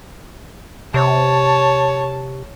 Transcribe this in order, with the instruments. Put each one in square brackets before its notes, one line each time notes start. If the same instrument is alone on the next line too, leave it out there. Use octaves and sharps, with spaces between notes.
[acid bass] C3 [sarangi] C#5 [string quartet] A5